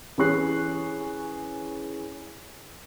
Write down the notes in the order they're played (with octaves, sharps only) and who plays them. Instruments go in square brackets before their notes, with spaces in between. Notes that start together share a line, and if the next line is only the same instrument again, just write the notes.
[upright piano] E3 C#4 G#4 C#6 F#6 C7